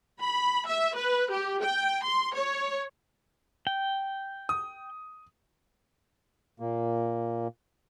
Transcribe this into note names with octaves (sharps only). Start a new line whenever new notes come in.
B5
E5
B4
G4
G5
C6
C#5
G5
D#6
A#2 A#3